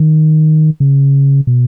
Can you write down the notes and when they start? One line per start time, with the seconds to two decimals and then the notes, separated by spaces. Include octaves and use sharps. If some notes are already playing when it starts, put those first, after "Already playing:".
Already playing: D#3
0.80 C#3
1.47 B2